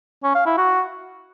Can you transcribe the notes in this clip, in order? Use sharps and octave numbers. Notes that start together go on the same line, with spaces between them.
C#4
F5
E4
F#4